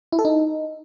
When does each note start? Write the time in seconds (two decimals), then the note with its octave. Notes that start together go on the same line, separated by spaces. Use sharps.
0.12 E4
0.19 A4
0.25 D#4